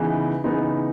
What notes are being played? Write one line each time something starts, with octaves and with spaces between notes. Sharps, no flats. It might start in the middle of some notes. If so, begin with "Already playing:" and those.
Already playing: C#3 E3 B3 D#4
C#3 E3 B3 D#4